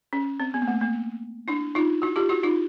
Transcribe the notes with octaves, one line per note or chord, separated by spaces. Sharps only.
C#4
C4
B3
A#3
A3
A#3
D4 E4
D#4 F4
E4 F#4
F4 G4
E4 F#4
D#4 F4